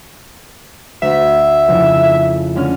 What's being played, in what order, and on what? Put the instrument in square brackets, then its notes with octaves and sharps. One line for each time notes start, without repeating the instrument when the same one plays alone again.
[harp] D2 [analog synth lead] E5
[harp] F2 C#3 E4
D3 C#4 F6